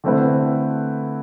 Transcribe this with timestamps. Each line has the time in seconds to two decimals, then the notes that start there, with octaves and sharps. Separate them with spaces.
0.04 D3 A3 C4 E4 B4